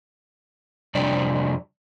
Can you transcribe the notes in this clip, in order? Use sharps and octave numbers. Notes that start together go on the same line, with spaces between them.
F2 C3 G3 D4 D5